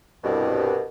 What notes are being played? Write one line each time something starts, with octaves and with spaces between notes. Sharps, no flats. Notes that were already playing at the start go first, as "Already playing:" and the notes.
C2 G2 B2